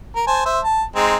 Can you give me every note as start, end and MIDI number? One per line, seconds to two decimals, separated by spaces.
0.16 0.25 70
0.27 0.42 72
0.27 0.42 80
0.27 0.42 81
0.46 0.60 72
0.46 0.60 76
0.64 0.83 81
0.96 1.17 56
0.96 1.17 60
0.96 1.17 63